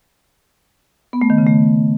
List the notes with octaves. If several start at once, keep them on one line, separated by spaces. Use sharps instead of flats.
B3
A3
D#3
C#3
A3